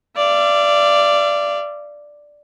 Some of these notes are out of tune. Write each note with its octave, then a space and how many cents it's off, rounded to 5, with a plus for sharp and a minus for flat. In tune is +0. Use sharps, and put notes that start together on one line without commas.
D5 +0 F5 -40